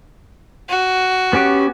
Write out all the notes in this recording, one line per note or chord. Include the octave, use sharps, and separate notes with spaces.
F#4
B3 C#4 G4